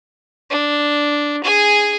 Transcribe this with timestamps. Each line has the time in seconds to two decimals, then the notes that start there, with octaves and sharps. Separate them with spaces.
0.50 D4
1.44 G#4 G#5